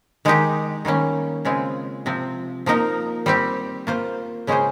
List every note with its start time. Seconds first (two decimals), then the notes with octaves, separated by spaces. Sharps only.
0.25 D#3 G#3 D#4 G4
0.85 D#3 G3 A#3 C#4
1.45 C#3 G#3 C4 F4 G#4
2.06 C3 F3 C4
2.66 F3 A#3 D#4 A#4
3.26 G3 C4 G4
3.87 A#3 F4 C5
4.47 C#3 G#3 C#4 G#4 C5